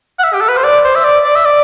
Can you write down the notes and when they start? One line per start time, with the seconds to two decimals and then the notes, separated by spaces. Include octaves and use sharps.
0.19 F#5
0.23 E5
0.34 G4
0.41 A4
0.49 B4
0.57 C5
0.64 D5
0.84 C5
0.95 E5
1.04 D5
1.25 D5
1.35 E5
1.45 D5